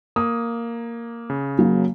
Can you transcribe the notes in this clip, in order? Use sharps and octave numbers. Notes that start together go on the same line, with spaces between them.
A#3 D#6
C#3
F#3 A#3